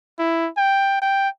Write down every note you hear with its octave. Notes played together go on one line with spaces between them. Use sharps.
E4
G5
G5